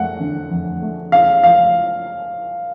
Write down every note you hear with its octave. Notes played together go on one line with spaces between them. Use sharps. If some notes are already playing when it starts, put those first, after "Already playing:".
Already playing: F2 A3 F#5
D3
F2
A3
C#3 F5
F3 F5